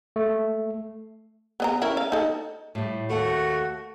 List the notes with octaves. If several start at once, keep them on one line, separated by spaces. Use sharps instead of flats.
A3
B3 D#5 A#5
C#4 E4 A#4
F5
D#4 A4
A2 G3
D#2 A3 F#4 F#5